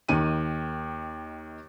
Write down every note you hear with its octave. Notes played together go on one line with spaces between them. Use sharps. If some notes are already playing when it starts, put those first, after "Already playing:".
D#2 D#3 D#7